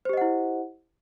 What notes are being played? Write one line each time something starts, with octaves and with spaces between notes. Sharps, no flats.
E4 G4 C5 D#5 F#5